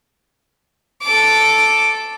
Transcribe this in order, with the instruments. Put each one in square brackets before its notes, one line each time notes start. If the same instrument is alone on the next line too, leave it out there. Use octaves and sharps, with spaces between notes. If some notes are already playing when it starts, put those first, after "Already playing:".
[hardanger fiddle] A4 D6